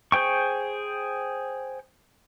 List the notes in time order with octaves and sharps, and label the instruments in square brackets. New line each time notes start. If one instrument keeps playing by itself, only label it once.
[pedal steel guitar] G#4 C5 G5 C#6